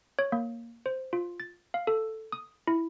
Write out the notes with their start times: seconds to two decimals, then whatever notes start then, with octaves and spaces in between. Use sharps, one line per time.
0.19 C#5
0.32 A#3
0.86 C5
1.13 F4
1.40 A6
1.74 F5
1.87 A4
2.32 D#6
2.67 E4